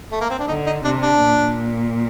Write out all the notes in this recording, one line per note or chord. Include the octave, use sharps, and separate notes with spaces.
A3
A#3
C4
D4
D3 D#4
D#4
C3 D4
D4
A#2